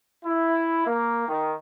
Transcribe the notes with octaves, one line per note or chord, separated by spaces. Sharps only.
E4
A#3
D#3